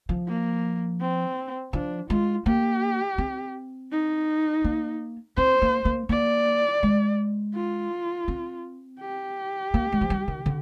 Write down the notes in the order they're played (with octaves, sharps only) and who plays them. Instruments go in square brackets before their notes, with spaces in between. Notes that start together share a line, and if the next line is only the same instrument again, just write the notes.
[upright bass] F3
[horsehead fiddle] A#3
C4
[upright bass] F3 [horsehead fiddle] D4
[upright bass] G#3 [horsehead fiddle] F4
[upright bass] A#3 [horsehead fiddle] G4
[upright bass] C4
[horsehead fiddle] D#4
[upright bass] A#3
[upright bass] C4 [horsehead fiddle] C5
[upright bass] A#3
A#3
[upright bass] A#3 [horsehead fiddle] D5
[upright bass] G#3
[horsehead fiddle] F4
[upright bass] C4
[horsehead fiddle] G4
[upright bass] A#3
G#3
F3
G3
D#3
D3